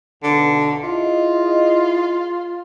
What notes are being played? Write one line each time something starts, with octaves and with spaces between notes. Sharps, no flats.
B1 D3
E4 F4 G#4 D#5